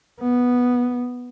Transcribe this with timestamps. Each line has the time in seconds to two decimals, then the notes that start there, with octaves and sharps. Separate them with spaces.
0.20 B3